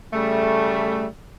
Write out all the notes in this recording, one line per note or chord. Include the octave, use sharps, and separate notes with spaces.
C#3 G3 A3